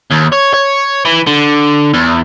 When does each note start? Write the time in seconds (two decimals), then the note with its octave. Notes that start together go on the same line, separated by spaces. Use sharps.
0.10 D#2
0.32 C#5
0.53 C#5
1.05 E3
1.27 D3
1.94 E2